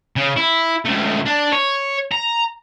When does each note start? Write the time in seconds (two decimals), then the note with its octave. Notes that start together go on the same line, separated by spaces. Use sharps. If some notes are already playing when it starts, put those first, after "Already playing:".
0.16 C#3
0.37 E4
0.85 C#2 A3
1.25 D4
1.52 C#5
2.12 A#5